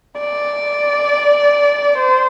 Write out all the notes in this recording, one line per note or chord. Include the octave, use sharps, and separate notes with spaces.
D5
C5